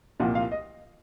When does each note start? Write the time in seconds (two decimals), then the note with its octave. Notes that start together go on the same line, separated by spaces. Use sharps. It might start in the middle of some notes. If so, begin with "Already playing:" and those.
0.20 C2 A#2 F3 F#5
0.35 F5
0.52 D#5